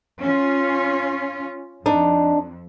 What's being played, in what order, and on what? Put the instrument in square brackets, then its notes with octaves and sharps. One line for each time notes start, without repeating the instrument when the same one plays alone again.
[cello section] C#4 F4
[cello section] F2 [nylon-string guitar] D4 D#4